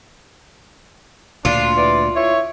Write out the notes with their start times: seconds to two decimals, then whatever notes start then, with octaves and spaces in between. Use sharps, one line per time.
1.45 D2 A#2 D4 F4
1.77 E3 D5
2.16 E4 C#5